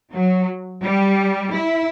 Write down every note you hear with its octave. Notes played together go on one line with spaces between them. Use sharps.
F#3
G3
E4